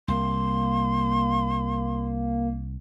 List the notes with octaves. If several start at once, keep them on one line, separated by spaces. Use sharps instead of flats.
C2 A#3 C6